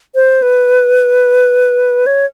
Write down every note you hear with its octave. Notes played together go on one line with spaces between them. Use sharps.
C5
B4
C#5